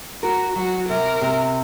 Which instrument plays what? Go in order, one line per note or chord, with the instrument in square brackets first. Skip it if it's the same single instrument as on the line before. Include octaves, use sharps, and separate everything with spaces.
[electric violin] F#4 [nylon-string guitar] A#4
[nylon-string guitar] F#3 [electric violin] F#4
[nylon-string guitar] C3 [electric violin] A#4
[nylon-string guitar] C3